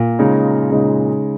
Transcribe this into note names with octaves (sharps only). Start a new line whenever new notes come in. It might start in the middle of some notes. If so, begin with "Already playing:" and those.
Already playing: A#2
C#3 G#3 D#4
C#3 G#3 D#4